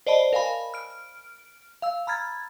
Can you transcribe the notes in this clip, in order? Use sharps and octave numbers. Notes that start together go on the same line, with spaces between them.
C5 D5 D#5 A5 B5
A#4 F5 G#5 B5
F6 D7
F5 E6
A#5 B5 F6 G#6 A6